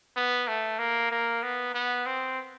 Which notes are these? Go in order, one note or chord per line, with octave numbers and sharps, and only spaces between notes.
B3
A3
A#3
A#3
B3
B3
C4